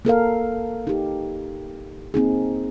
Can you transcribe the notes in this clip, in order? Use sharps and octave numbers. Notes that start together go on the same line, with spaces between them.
A#3 A4 A#4 F5
D#4 G4
A#3 C4 D#4 G#4